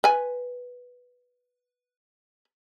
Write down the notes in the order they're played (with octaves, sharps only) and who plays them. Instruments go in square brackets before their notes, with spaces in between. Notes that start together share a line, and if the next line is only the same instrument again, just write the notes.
[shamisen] B4 G#5